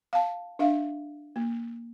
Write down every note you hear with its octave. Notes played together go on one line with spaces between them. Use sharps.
F5 A5
D4 E5 F5
A#3